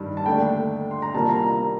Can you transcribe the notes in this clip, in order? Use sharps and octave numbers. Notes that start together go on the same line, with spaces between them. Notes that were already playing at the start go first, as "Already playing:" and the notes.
Already playing: G2 D#3 G3
A5
D#2 D3 A3 D4 G5
C6
A#5
C2 C3 G3 A#3 F4 A5
A#5